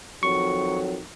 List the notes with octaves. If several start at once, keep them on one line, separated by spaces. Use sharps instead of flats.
F2 D#3 F#3 C#6